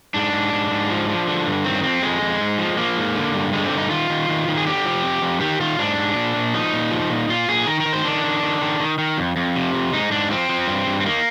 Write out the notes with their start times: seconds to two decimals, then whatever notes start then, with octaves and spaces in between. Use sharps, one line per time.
0.14 G#2 D4
0.33 G#2
0.53 G#2
0.71 G#2
0.90 F3
1.09 F3
1.28 D3
1.46 G2
1.65 D#3 C4
1.83 F2 C4
2.02 F2 G#3
2.22 F2
2.40 G#2
2.59 F3
2.77 F3 A#3
2.97 G#2
3.16 D3
3.34 G2
3.53 D3 G#3
3.66 C4
3.73 G2
3.78 D#4
3.90 D#3 F4
4.10 D#3
4.29 D#3
4.48 D#3
4.57 G#4
4.66 D3 G4
4.85 F3
5.03 F2
5.22 F2
5.41 D#3 G4
5.60 D#3 F4
5.79 G#2 D4
5.98 G#2
6.16 A#2
6.36 A#2
6.54 F3 D#4
6.73 A#2
6.91 F3
7.10 A#2
7.29 A#2 F4
7.49 A#2 G#4
7.67 D#3 A#4
7.80 A#4
7.86 D#3
7.93 C5
8.04 D#3 D4
8.24 D#3
8.43 D#3
8.61 D#3
8.80 D#3
8.98 D#3
9.18 F2
9.36 F2
9.56 C3
9.74 F2
9.93 G#2 D#4
10.11 G#2 D4
10.30 F3 C4
10.49 F3
10.67 G2
10.87 G2
11.01 C4
11.06 D#3 A#3